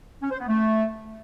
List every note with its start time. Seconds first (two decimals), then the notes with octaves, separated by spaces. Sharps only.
0.22 C#4
0.30 C5
0.39 B3
0.47 A3